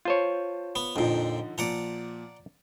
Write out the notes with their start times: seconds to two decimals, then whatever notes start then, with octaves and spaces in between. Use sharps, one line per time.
0.05 F4 C5 C#5 A5 G6
0.76 B3
0.96 F2 A#2 D3 F3 D#4
1.58 A#2 F3 D5 F#5 A#5